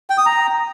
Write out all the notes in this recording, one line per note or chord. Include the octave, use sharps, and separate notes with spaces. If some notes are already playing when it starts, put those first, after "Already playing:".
G5
D#6
A#5